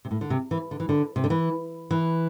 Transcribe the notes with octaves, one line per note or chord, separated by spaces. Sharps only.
C3
A2
D3
C3
E3
D3
E3
D3
C3
D3
E3
E3